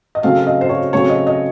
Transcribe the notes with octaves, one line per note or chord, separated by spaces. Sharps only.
D#5
C#3 F#3 A3 C4 F5
D#5
C5
C#5
C#3 F#3 A3 C4 C#5
D#5
D#5